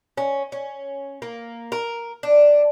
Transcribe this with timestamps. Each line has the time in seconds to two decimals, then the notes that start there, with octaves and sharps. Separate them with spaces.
0.17 C#4
0.52 C#4
1.22 A#3
1.72 A#4
2.23 D4